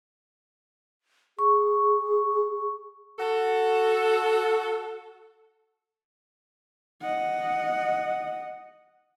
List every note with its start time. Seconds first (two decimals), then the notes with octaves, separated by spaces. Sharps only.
1.39 G#4 C#6
3.19 F#4 A4
7.01 D#5 F#5